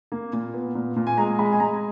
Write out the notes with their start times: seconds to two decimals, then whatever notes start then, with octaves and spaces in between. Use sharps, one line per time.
0.12 A#3
0.33 A#2
0.54 B3
0.75 A#2
0.96 A#2
1.07 G#5
1.17 G#3 A#5
1.39 G#3 B5
1.52 G#5
1.60 G#3 A#5